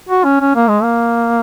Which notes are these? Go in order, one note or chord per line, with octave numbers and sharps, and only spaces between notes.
F#4
C#4
C#4
A#3
G#3
A#3